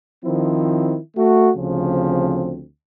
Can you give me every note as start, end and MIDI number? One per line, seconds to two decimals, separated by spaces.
0.25 0.98 51
0.25 0.98 53
0.25 0.98 60
0.25 0.98 64
1.17 1.51 57
1.17 1.51 66
1.56 2.63 38
1.56 2.63 49
1.56 2.63 53
1.56 2.63 60